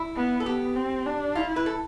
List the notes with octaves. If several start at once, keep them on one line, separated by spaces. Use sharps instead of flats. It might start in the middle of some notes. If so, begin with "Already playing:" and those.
Already playing: E4
B3
A4
B3 G4
C4
D4
E4 F4
B4
A4